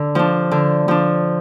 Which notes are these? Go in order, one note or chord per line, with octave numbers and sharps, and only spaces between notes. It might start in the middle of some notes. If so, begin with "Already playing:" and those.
Already playing: D3
F3 D4
D3
F3 D4